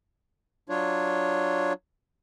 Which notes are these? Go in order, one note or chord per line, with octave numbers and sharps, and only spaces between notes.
F#3 D4 F4 C#5